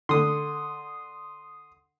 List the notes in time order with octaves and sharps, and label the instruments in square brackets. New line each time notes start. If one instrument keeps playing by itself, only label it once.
[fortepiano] D3 [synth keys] C6 D#6